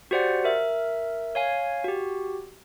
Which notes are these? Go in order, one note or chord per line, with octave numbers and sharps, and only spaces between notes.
F#4 G4 C5 D5 F#5
A#4 E5
C#5 F5 G#5
F#4 G4